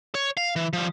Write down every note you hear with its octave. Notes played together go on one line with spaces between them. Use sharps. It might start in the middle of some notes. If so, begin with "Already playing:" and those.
C#5
F5
E3
F3 G3